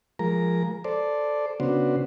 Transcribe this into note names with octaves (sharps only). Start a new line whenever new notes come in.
F3 G#3 A#4 A#5
A4 C5 D5
C#3 B3 D4 F#4 C5